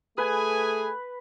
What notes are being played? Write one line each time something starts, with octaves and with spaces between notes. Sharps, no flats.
A3 G#4 B4 G#5